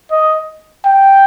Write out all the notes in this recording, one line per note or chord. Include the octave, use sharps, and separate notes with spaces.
D#5
G5